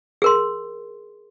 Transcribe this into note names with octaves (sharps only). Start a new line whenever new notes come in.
G#4 A#4 C6